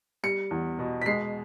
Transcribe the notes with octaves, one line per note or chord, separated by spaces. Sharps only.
G3 C#7
E2
B2
B6
G#3 C7